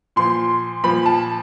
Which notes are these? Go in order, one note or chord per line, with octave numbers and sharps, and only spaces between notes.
A#2 F3 C6
A#2 F3 B5
A5